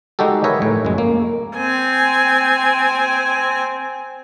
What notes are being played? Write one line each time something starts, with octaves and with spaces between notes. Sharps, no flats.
G#3 D#4 F#4 G4 A4
A#4 B4 C#5 D#5 E5 G#5
A2 C#5
F#2 G#3
A#3
C4 G#5